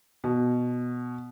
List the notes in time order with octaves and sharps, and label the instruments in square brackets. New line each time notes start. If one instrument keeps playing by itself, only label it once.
[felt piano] B2